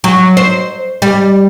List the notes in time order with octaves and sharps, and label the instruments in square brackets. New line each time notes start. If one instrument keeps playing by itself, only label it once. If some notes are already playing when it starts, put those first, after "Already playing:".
[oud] F#3
C5
G3